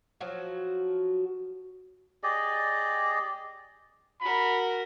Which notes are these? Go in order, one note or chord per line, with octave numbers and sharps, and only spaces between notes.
F3 F#3 F#4
G4 G#4 D5 D#5
F#4 A#4 B5